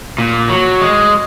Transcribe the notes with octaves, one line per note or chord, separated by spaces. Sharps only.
A#2
F#3
G#3